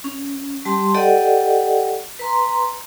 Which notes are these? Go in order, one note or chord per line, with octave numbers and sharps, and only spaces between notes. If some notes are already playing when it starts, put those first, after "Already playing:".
C#4
G3 G4 A5 C6
G4 A4 D5 D#5 F#5 G5
B4 A#5 C6